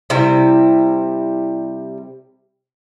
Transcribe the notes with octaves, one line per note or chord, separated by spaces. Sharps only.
C3 G3 E4